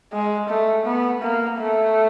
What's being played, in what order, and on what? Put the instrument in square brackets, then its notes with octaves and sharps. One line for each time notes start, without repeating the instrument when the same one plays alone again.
[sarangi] G#3
A3
B3
A#3
A3